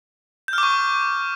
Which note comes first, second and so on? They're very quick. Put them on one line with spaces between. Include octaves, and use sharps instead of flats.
G6 F6 D6 C#6